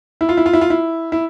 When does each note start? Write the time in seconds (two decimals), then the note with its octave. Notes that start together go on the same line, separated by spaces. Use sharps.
0.21 E4
0.29 F4
0.37 E4
0.46 F4
0.53 E4
0.61 F4
0.70 E4
1.12 E4